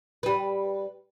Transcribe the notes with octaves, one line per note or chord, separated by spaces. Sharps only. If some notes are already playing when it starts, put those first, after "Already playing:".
G3 B4